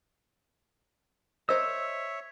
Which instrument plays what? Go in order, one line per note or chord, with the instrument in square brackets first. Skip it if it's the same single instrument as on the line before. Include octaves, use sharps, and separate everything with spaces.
[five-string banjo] A#4 C5 D#5 [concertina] C#5 E5 [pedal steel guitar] E6